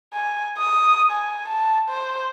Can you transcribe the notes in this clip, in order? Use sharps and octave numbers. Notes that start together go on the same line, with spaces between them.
G#5
D#6
G#5
A5
C5